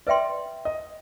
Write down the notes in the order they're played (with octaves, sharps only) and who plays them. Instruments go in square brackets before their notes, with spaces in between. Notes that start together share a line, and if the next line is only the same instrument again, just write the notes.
[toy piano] B4 E5 G5 C6 [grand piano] D5
[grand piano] D#5